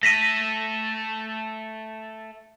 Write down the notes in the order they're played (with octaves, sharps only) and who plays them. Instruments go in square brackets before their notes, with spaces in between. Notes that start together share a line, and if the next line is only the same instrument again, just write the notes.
[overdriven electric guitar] A3 A4 [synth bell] A#6 B6 D#7